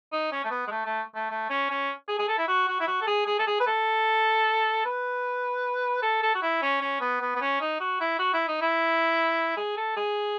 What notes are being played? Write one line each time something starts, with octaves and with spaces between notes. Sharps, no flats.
D#4
C#4
A3
B3
G#3
A3
A3
A3
A3
C#4
C#4
G#4
G#4
A4
E4
F#4
F#4
E4
F#4
A4
G#4
G#4
A4
G#4
B4
A4
B4
A4
A4
F#4
E4
C#4
C#4
B3
B3
B3
C#4
D#4
F#4
E4
F#4
E4
D#4
E4
G#4
A4
G#4